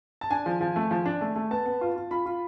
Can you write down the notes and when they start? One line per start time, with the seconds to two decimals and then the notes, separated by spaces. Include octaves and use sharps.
0.21 A5
0.31 D4 G#5
0.46 F3
0.61 F3
0.76 A3
0.91 F3
1.06 D4
1.21 A3
1.36 A3
1.51 B3 A5
1.66 B3
1.81 F4
1.96 F4
2.11 F4 B5
2.26 F4